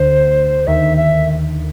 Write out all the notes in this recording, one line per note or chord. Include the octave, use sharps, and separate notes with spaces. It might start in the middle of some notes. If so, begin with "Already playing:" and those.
Already playing: D2 D3 C5
D#2 D#3 E5
E5